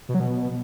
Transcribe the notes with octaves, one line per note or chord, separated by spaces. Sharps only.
B2
F#3
B2